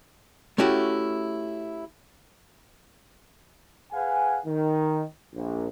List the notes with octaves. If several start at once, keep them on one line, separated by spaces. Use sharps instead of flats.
A3 C#4 E4 F#4 G4
G#4 B4 F5 F#5 G#5
D#3
A#1